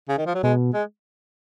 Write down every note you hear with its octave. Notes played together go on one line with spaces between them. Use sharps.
C#3
D#3
F3
F#3
B2 G#3
G#3